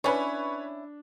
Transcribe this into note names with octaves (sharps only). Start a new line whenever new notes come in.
C#4 D4 E4 B4 C#5